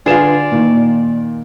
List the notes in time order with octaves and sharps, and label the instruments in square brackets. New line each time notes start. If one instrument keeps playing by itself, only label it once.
[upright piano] D3 B4 E7 [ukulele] F4 G#4 [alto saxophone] D5
[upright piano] A#2 D#3